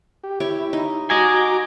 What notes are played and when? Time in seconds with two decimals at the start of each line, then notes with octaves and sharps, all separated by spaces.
0.24 G4
0.40 E4 G4 C#5
0.73 D#4
1.10 F#4 D#5 G#5 A#5 D6